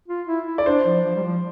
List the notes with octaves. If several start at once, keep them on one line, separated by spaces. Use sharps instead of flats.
F4
E4
E4
D5
D4 C5
F3
F3
G3
F3